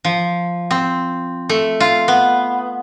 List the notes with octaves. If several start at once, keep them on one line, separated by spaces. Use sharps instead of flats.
F3
C4
A3
F4
B3